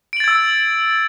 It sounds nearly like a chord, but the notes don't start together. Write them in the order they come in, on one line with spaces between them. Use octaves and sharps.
D7 F#7 A6 G#6 E6